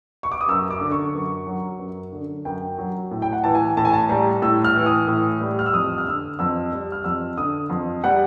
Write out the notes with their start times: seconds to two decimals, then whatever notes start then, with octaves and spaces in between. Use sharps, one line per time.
0.23 C#6
0.32 D6
0.41 D#6
0.48 F#2 E6
0.70 D6
0.81 D3
0.92 C#6
1.14 F#2
1.47 F#3
1.79 F#2
2.12 D3
2.45 F#2 G5
2.78 F#3
3.11 A2
3.22 G5
3.33 F#5
3.44 E3 A5
3.55 G#5
3.77 A2 A5
3.85 G#5
3.93 A5
4.09 G3 A#5
4.42 A2 E6
4.64 F6
4.76 E3
4.86 D#6
5.07 A2
5.41 G3
5.59 F6
5.66 E6
5.73 F2 D#6
5.98 F6
6.06 D3 E6
6.39 F2 E6
6.72 G3
6.92 F6
7.04 F2 E6
7.37 D3 D#6
7.70 F2
8.04 G3 F#5